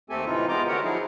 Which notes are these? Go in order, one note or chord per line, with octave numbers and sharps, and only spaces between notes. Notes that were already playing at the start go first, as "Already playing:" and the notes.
D#2 A3 C4 G4 A4 G#5
A2 C3 E3 D#4 F4
G#3 B3 F4 A#5 D6 G6
D3 F#4 G4 A#4 C#5 F#5
F3 F#3 D#4 E4 G#4